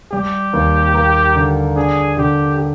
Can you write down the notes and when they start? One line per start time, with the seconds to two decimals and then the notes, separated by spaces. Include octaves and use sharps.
0.12 G3 G4
0.53 D#2
0.94 A#3
1.35 D3
1.76 D4 G#4
2.17 D3 G4
2.58 G4